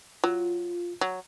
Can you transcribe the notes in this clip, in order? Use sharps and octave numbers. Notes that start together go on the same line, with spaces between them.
F#3 F4
F#3